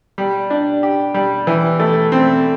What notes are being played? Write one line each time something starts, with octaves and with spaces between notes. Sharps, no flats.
G3
D4
G4
G3
E3
A3
C4